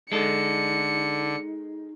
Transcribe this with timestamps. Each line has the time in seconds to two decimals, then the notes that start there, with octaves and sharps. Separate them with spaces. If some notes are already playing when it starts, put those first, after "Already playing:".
0.12 D3 G#3 D#4 A4 C#7